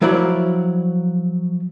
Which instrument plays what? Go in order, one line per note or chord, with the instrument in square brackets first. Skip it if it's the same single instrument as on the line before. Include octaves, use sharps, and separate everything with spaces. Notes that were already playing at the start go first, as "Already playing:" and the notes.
[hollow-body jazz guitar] F3 F#3 E4 C5 D5 B5